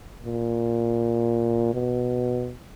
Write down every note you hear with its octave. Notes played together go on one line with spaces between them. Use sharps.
A#2
B2